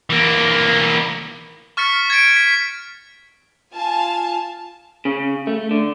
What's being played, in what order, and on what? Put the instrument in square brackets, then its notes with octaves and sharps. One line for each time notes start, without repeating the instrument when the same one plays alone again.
[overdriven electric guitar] E3 A#3
[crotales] C#6 F6 A6 B6 C#7
G#6 A6 C#7 D7
B6
[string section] F4 F5 G#5 A5
[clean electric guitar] C#3
A3
D3